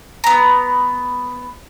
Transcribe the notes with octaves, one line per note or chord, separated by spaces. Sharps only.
B3 A#5